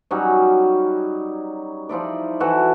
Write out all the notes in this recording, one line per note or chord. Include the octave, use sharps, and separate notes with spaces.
F#3 G3 C#4 D#4
F3 D#4 E4 D5
E3 E4 F#4 A4